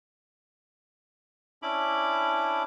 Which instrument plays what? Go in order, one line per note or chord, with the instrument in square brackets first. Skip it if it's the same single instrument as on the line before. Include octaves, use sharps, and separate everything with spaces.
[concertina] C#4 D4 E4 B5 D6